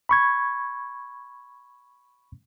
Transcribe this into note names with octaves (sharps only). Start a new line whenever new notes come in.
B5 C#6 G#6